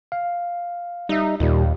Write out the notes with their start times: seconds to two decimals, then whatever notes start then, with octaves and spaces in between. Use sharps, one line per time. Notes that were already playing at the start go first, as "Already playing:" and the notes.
0.12 F5
1.09 G3 D#4 E5
1.40 D#2 A#2 D#3 G3